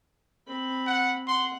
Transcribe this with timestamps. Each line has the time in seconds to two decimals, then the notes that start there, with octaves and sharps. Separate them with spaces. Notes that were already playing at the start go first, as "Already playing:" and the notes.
0.47 C4 B5
0.87 F#5
1.27 F#5 C6